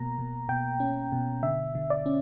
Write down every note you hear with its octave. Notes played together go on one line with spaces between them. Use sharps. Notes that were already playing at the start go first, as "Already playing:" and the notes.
Already playing: B2 A#3 A#5
B2
B2 G5
C#4
B2
D3 E5
D3
D5
C#4